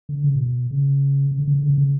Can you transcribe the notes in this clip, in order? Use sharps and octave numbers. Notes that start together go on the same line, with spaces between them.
D3
C#3
A2
B2
C#3
C#3
D3
C#3
D3
C#3
D3
C#3